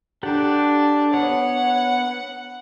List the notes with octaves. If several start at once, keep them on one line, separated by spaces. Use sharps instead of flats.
D4 G4 A4 F#5
B3 C#5 F#5